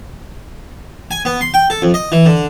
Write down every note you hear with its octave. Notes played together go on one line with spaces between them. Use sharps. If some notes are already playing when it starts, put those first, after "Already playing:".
G#5
B3
C6
G5
A4
F2
D#5
E3
D3